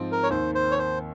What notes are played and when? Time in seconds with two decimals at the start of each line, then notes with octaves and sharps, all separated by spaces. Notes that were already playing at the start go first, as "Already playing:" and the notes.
Already playing: G#2 F3 C4 F4
0.12 A#4
0.23 C#5
0.30 D#2 D#3 A#3 C5
0.55 C5
0.71 C#5
0.79 C5